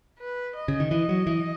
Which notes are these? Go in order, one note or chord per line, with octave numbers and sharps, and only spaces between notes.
B4
D#5
C#3
D#3
E3 D#5
F#3
E3